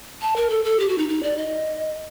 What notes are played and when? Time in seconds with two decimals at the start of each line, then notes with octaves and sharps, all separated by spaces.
0.22 A5
0.36 A#4
0.50 A4
0.65 A4
0.80 G4
0.89 F#4
0.98 D#4
1.09 D#4
1.23 D5
1.37 D#5